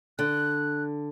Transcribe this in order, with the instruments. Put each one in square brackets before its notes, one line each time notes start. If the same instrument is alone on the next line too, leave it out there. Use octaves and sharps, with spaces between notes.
[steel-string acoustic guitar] D3 [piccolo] F#6